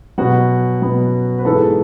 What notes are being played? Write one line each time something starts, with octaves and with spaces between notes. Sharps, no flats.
B2 F#3 B3 F#4
B2 F#3 B3
B4
G#2 E3 G#3 B3 A4